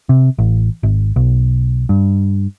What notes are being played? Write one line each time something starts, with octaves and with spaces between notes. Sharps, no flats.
C3
A1
G#1
B1
G2